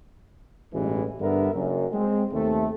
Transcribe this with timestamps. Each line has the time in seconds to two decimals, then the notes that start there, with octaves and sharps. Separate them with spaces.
0.73 A1 G2 B2 E3 G#3
1.20 G2 D3 B3 A#4 E5
1.53 F#1 F#2
1.92 G#3 C4
2.32 D#2 C3 A3